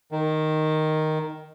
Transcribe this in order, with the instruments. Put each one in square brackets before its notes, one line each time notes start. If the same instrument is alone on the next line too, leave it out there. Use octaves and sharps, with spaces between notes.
[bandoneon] D#3